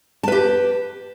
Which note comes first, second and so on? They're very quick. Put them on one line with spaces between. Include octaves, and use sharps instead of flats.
A5 B4 G4